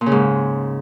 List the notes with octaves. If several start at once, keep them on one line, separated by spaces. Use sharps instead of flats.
A#2
C#3
G#2